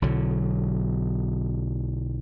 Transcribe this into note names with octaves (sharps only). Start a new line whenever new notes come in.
B1 D3 F#3